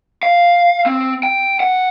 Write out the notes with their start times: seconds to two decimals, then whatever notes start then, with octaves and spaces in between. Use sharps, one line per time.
0.23 F5
0.86 C4
1.23 G5
1.60 F#5